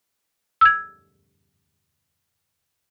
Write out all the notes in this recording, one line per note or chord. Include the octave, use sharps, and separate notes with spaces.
E6 G#6